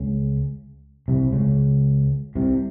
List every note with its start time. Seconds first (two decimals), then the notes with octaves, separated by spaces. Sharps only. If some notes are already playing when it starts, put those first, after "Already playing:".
Already playing: C#2 C#3
1.08 C2 C3
1.33 C#2 C#3
2.35 C2 C3